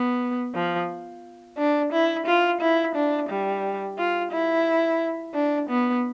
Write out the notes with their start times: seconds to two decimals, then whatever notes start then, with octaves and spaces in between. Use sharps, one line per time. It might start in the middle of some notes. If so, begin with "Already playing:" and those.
Already playing: B3
0.54 F3
1.58 D4
1.92 E4
2.26 F4
2.61 E4
2.95 D4
3.29 G3
3.98 F4
4.32 E4
5.34 D4
5.69 B3